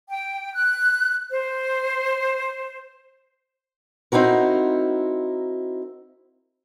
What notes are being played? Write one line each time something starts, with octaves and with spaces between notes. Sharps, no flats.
G5
F#6
C5
C4 D#4 E4 F#4 A#4